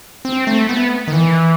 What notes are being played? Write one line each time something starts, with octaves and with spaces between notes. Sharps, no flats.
C4
A3
B3
D#3
E3